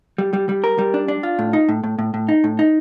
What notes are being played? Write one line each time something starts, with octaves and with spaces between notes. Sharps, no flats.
G3
G3
G3
A#4
G3
D4
D4
F4
A2
D#4
A2
A2
A2
A2
D#4
A2
D#4